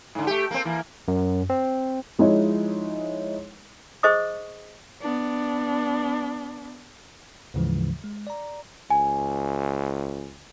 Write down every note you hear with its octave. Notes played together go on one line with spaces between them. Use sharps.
G#2 D3
A3 G4
A#3 C4
E3 A#3
F#2
C4
F3 G#3 D#4 E4 C#5
G#4 C5 D#5 C#6 D#6
B3 D4
D2 G#2 C#3 E3 F3 G#3
G#3
D5 A#5
C#2 G#5